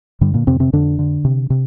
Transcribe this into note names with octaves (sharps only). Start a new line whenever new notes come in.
G2 D3 G3
A#2 A#3
F2 C3 C4
C3 C4
F2 D3 D4
D3
C3
C3